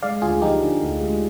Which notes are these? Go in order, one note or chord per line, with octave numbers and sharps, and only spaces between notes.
G#3 D5 F5
D2 F4 G#4
F3 D#4 G4
D3
D2
G#3